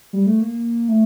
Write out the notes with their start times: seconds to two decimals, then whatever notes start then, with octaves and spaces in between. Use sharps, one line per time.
0.13 G3
0.26 A3
0.41 A#3
0.89 A3